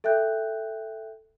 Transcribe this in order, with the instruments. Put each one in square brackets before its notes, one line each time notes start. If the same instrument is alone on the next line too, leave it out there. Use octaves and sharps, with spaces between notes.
[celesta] A4 E5 G5 F#6 G6